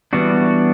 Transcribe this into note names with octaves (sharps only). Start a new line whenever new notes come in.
E3 G3 B3 D4 F#4